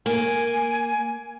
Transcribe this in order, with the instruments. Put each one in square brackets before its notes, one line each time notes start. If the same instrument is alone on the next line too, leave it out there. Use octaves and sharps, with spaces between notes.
[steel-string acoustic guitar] A#3 [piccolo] G#5